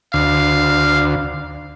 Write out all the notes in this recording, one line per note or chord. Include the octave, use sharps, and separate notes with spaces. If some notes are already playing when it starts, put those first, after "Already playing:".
D2 F5